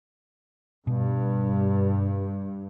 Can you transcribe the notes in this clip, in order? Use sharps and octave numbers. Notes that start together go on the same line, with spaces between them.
G2 B2